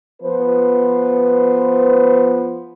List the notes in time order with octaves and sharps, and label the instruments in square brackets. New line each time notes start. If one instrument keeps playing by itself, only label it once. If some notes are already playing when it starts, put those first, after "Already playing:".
[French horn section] F3 B3 B4 C5